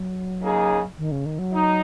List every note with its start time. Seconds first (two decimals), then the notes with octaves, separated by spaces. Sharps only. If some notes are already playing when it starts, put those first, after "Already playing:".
Already playing: F#3
0.43 C#3 A#3 D#4 G#4
0.98 D#3
1.12 C#3
1.26 D#3
1.39 F#3
1.52 D#4